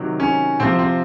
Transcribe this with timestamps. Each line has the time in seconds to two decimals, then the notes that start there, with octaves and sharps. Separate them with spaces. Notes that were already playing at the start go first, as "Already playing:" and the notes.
Already playing: C3 D#3 F#3
0.20 C#4
0.60 C3 F3 C4
0.79 C4